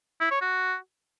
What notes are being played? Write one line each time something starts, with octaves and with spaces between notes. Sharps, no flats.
E4
C#5
F#4